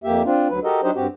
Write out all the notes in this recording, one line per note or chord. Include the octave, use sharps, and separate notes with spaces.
F2 A#3 G4 E5
C4 D4 F4
D2 F#3 B4
F#4 G4 A4 A#4 D#5
F#3 D4 D#4 G4 C5 D#5
G2 C4 F#4 G4